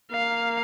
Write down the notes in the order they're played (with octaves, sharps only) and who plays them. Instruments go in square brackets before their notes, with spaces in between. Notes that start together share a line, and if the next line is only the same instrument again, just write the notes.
[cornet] A#3 [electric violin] F5